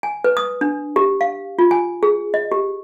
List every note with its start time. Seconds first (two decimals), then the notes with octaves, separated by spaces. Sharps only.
0.03 G#5
0.24 B4
0.37 D#6
0.61 D4
0.96 G4
1.21 F5
1.59 F4
1.71 G#5
2.03 G#4
2.34 D#5
2.52 G4